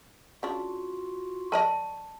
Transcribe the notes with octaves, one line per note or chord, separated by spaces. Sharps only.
C#3 D4 F4 F#4
A#4 D5 D#5 A5 C#6